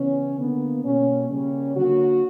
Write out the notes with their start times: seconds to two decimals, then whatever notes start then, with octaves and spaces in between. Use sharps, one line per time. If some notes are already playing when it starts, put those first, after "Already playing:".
Already playing: C#3 E3 B3 C#4
0.38 D3 A#3 B3
0.84 B2 G3 A#3 C#4
1.30 C#3 G3 A#3 C#4
1.76 D3 F#3 A#3 F#4